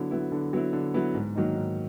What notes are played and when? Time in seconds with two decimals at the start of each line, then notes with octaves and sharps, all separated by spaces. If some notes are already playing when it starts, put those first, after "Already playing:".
Already playing: D3 F#3 B3 E4
0.11 F#3 B3 E4
0.32 D3
0.53 F#3 B3 E4
0.73 D3
0.94 F#3 B3 E4
1.14 G#2
1.35 D#3 F#3 A#3 D#4
1.56 G#2